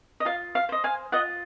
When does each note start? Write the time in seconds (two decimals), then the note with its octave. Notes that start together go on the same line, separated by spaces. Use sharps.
0.20 D#5
0.25 F4 F5
0.55 F5
0.69 C5 D#5
0.84 F5 G#5
1.12 F4 D#5 F#5